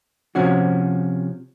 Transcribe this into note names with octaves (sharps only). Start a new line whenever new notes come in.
C3 F3 C#4 F#4